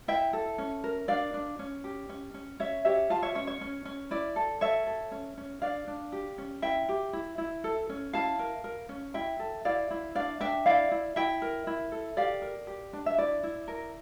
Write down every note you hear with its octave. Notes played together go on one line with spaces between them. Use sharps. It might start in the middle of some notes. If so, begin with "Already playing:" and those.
E4 E5 G5
A4
C#4
A#4
D4 D5 F5
D4
C#4
G4
C#4
C#4
C#4 C#5 E5
G4 C#5 E5
F4 F5 A5
C#5 E5
C#4 C#5
C#5
C#4
C#4
E4 D5
A4
A4 C#5 E5
A4
C#4
C#4
D4 D5 F5
D4
G4
C#4
E4 E5 G5
G4
E4
E4
A4
C#4
E4 F5 A5
A#4
A#4
C#4
E4 E5 G5
A4
E4 D5 F5
E4
D4 D5 F5
D4 E5 G5
E4 D5 F5
E4
E4 E5 G5
A#4
E4
A4
G4 D5 F5
A#4
G4
D4
E5
E4 D5
E4
A#4